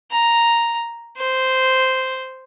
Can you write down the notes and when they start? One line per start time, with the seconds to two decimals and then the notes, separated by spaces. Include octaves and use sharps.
0.12 A#5
1.17 C5